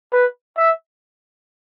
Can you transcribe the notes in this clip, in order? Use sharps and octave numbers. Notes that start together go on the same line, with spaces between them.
B4
E5